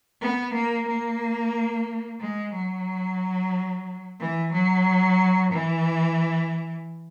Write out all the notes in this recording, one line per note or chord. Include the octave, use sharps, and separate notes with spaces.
B3
A#3
A#3
G#3
F#3
E3
F#3
E3